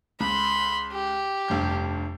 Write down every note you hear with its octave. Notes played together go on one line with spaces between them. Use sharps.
C#2 B5 C6
G4
F1 G2 G6